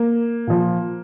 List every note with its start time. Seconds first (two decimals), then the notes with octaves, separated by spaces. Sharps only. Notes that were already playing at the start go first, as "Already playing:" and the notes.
Already playing: A#3
0.47 A#2 F3